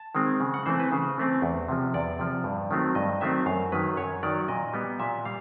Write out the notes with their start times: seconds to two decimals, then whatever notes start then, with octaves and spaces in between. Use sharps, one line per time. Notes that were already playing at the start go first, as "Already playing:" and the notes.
Already playing: A5
0.15 D#3 G#3 C4
0.40 C#3
0.54 F#5
0.66 E3 A3 C4 C5
0.80 B4
0.92 C#3 C5
1.18 E3 A3 C4
1.42 E2
1.69 C3 F3
1.94 E2 D5
2.19 C3 F3
2.44 G2
2.71 D#3 F#3 A3 C4
2.95 G2 D#5
3.21 D#3 F#3 A3 C4 E5
3.46 F#2 F5
3.72 D#3 F#3 B4
3.97 F#2 C#5
4.23 D#3 F#3 D5
4.48 A#2 D#5
4.73 G3 B3
4.99 A#2 E5
5.25 G3 F5